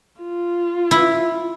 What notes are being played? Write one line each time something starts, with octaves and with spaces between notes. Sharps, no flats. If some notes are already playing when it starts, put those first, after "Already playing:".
F4
E4